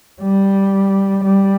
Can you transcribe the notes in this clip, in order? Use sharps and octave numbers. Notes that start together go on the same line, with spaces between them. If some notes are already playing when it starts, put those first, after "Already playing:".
G3
G3